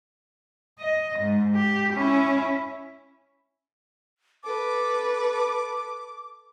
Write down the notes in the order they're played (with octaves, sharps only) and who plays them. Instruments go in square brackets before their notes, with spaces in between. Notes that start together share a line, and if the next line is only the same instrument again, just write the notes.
[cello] D#5
G#2
G4
C#4 E4
[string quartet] A4 B4 [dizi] D6